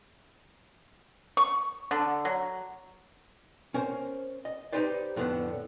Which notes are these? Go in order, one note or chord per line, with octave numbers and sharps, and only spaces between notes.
C#6
D3
F#3
C#4 A#4 C5
D#5
D#4 F#4 G4 B4 C5 D5
F2 A2 D3 B3